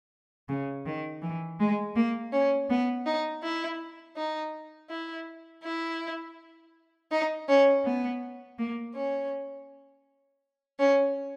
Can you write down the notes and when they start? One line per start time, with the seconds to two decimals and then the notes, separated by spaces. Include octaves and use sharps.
0.48 C#3
0.85 D#3
1.22 E3
1.59 G#3
1.95 A#3
2.32 C#4
2.69 B3
3.06 D#4
3.43 E4
4.16 D#4
4.90 E4
5.64 E4
7.11 D#4
7.48 C#4
7.84 B3
8.58 A#3
8.95 C#4
10.79 C#4